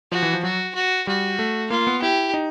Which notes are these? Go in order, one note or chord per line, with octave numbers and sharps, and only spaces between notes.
F3 F#4
E3
F3
F#3 F#4
F#4
G3 F#4
A3
A#3 F4
B3
E4 G4
D#4